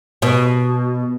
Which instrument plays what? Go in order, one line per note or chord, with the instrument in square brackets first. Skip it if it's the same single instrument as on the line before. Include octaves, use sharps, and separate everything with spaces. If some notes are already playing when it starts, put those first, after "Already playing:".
[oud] B2